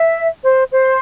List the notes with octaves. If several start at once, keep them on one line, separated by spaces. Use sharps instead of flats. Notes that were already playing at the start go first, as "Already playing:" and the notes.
Already playing: E5
C5
C5